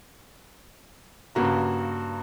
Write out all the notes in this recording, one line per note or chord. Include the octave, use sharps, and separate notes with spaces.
G2 C#3 A#3 F#4 A#5